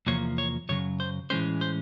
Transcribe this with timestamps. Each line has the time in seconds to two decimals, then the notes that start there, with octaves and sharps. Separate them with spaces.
0.07 E2 C3 F3 A#3 C#5
0.38 C#5
0.69 F#2 C#3 F#3 C#5
1.00 C5
1.30 A2 E3 G#3 C#4 C5
1.61 C5